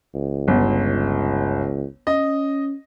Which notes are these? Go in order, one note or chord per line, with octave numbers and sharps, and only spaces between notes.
C#2
G1
C#4 D#5